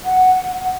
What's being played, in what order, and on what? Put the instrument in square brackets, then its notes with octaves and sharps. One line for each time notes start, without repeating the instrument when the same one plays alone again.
[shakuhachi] F#5